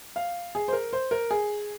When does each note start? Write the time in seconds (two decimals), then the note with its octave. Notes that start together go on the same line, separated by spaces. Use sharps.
0.16 F5
0.55 G#4
0.68 C5
0.73 A#4
0.93 C5
1.11 A#4
1.31 G#4